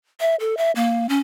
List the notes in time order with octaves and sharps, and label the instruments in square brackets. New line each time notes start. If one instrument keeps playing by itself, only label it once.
[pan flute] E5
A4
E5
A#3
C#4